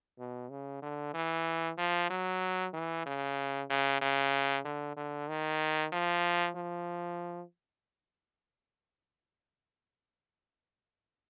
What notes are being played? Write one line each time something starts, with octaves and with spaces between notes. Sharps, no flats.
B2
C#3
D3
E3
F3
F#3
E3
C#3
C#3
C#3
D3
D3
D#3
F3
F3